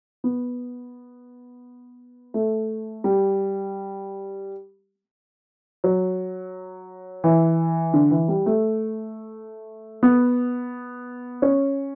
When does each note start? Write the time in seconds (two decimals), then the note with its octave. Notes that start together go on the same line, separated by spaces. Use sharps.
0.24 B3
2.34 A3
3.04 G3
5.84 F#3
7.24 E3
7.94 D3
8.11 E3
8.28 G3
8.46 A3
10.03 B3
11.42 C#4